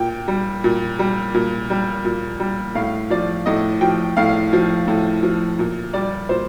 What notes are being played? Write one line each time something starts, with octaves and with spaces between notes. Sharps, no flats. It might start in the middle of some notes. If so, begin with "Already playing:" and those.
Already playing: A#2 G5
G3
A#2
G3
A#2
G3
A#2
G3
A2 F5
F3 D5
A2 D#5
F3 G5
A2 F5
F3
A2
F3
A#2
G3 D5
A#2 C5